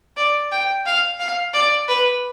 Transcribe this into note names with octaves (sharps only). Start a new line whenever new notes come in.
D5
G5
F5
F5
D5
B4